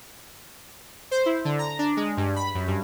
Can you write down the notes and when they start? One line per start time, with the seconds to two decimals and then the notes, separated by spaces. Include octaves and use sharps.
1.11 C5
1.26 E4
1.45 D3
1.59 A#5
1.79 D4
1.97 G#3
2.17 G2
2.36 B5
2.55 F#2
2.68 G2